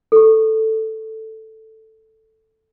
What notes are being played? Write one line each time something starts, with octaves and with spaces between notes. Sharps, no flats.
G4 A4